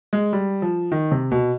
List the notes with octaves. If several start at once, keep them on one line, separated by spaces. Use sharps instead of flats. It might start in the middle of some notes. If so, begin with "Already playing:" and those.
G#3
G3
F3
D#3
C3
B2